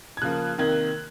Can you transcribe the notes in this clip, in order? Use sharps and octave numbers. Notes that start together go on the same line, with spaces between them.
G#6
C#3 F3 A#3 F#6
C3 D#3 A#3 G#6